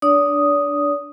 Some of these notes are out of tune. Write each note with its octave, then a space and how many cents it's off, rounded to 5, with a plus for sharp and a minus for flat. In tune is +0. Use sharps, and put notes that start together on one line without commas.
D4 +0 D5 -40 D#6 +0